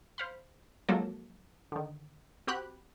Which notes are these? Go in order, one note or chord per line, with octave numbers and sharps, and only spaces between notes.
C5 F5 B5
F3 F#3 G#3 A#3 C4 A4
D3 D#3
C4 F#4 G4 B5 F#6